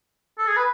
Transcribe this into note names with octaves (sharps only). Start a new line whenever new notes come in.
A4
G#4
B4